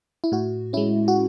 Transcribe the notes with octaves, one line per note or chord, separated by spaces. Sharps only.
E4
A2 F#4
G#3 C#4 E4
F#4